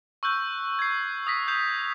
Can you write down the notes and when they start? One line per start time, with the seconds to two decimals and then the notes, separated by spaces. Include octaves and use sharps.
0.23 C#6 E6 F#6 G6
0.79 G#6 C7
1.27 D#6 A#6 B6
1.48 G6 C7 F7